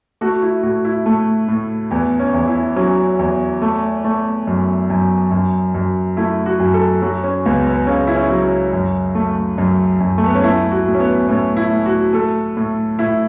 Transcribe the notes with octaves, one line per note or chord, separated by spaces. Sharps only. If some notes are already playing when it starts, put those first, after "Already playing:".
A3 F#4
E4
A2 F#4
E4
A2 A3
A2
E2 B3
C#4
E2
E4
F#3 C#4
E2
A3
A3
F#2
F#2
F#2
F#2
A3 E4
F#4
F#2
A4
F#3 F#4
C#4
C#2 B3
B3
C#3 C#4
E4
C#4
F#3
C#4
F#2
A3
F#2
F#2
A3
B3
C#4
A3 E4
F#4
A2
C#4
B3
A2 C#4
E4
A2
F#4
A3 A4
A2
A2 E4